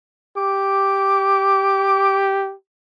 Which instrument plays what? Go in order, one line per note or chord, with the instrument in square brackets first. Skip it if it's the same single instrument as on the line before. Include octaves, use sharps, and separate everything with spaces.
[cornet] G4 [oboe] D6